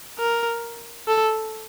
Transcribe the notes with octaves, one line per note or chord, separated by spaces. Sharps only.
A#4
A4